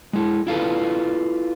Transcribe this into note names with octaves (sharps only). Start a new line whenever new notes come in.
G#3 E4
E4 F4 A4 B4